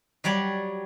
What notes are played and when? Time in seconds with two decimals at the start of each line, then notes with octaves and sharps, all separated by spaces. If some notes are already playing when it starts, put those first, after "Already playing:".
0.24 F#3 G3 C#5 D5